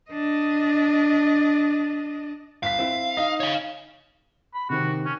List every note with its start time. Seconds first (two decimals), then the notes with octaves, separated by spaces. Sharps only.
0.11 D4 D#5
2.63 G1 F5 B6
2.79 C4 E4
3.17 D#4 D#5
3.40 C#5 F5
4.54 B5
4.70 C3 D#3 C4 F#4
5.06 C#4